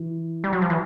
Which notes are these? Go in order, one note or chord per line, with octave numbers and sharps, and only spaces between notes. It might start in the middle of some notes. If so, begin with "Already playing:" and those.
Already playing: E3
G3
F#3
F3
E3